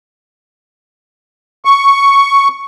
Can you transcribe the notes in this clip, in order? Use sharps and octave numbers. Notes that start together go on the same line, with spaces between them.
C#6